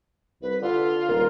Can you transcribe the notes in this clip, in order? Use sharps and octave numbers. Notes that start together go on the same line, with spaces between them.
C2 B4
D3 F4
D#1 A#4